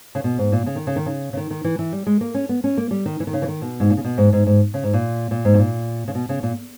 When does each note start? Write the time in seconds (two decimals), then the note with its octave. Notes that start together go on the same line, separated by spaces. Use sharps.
0.15 C#3
0.24 B2
0.38 G#2
0.52 A#2
0.66 C#3
0.76 D#3
0.87 C#3
0.96 D#3
1.06 C#3
1.33 C#3
1.37 D#3
1.51 D#3
1.64 E3
1.79 E3
1.93 G3
2.07 G#3
2.21 A#3
2.34 C#4
2.49 B3
2.64 C#4
2.78 A#3
2.91 G3
3.06 D#3
3.20 E3
3.27 D#3
3.33 C#3
3.42 E3
3.48 D#3
3.62 B2
3.80 G#2
3.90 A#2
3.97 C#3
4.04 B2
4.18 G#2
4.33 G#2
4.47 G#2
4.74 C#3
4.83 G#2
4.93 A#2
5.31 A#2
5.45 G#2
5.53 B2
5.59 A#2
6.08 C#3
6.15 B2
6.29 C#3
6.43 A#2